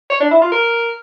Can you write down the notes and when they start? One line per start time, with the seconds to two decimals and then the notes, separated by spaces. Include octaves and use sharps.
0.10 C#5
0.20 D4
0.31 E4
0.42 F4
0.52 A#4